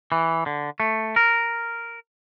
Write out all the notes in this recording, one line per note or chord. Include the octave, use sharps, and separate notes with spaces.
E3
D3
A3
A#4